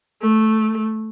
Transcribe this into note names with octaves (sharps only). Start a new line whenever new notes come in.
A3